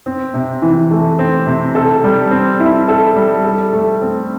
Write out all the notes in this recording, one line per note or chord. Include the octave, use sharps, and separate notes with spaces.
C4
C3
E3
A3
C4
C3
A4
G3
C4
E4
A4
G3
A4
A3
C4